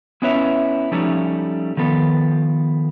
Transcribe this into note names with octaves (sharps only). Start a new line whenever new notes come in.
B3 C#4 E4 B4 C#5 E5
F3 G3 A3 C#4 D#4
D#3 F3 B3 A4